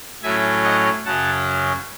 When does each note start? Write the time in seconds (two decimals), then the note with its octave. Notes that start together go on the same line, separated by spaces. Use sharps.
0.23 A2 F#3 C#4 E5 G#5
0.64 D#5 F#5
1.06 F#2 C#3 F#3 C#4 F#5 A5